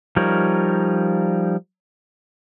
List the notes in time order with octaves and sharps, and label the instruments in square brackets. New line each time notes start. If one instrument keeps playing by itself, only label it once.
[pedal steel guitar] F3 G3 D#4 A#4 C#5